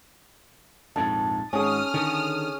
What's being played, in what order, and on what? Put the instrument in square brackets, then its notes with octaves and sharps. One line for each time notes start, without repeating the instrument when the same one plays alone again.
[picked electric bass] A#1 F2 G#2 [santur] A5
[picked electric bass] G#1 G#2 [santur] C#4 G#4 [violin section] D#6 F6
[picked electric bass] D3 D#3